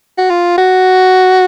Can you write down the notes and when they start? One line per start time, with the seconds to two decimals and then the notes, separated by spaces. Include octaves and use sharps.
0.18 F#4
0.30 F4
0.58 F#4